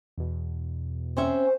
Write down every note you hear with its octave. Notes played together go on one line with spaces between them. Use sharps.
E2 B2
C4 C#4 C5 E5